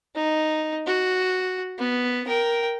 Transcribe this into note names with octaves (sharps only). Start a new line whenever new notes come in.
D#4
F#4
B3
A#4 G5